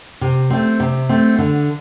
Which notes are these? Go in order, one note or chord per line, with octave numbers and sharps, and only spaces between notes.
C3
A3 C4
C3
A3 C4
D3